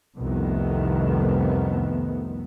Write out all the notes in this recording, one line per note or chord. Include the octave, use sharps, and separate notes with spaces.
C2 F2 D#3 A3 B3